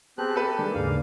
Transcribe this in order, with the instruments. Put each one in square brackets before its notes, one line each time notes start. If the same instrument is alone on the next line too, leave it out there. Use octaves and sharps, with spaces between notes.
[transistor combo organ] B3 G#4 [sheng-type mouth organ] C4 G4 F#6 [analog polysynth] A5
[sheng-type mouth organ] G4 [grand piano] A4 B4
[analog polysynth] D#3 G3 G#4 [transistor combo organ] G#3 A#3 D4
[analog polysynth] D#2 G#2 C#3 [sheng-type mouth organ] F5